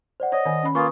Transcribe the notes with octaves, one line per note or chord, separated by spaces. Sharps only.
C5 D5 F#5
C#5 D#5
D#3 G#5
C#4 B5
A#3 F4 B4 G#5 B5 C#6 D#6